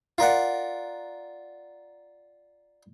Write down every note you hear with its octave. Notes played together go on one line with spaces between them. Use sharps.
F4 A#4 D5 F#5